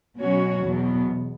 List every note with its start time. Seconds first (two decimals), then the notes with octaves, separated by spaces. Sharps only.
0.19 B2 F#3 C#4 F#4 C#5
0.64 E2 B2 F#3 B3